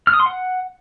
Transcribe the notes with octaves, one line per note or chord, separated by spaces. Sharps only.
F6
D#6
C6
F#5